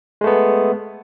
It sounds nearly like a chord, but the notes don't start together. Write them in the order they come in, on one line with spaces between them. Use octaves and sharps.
G#3 A3 B3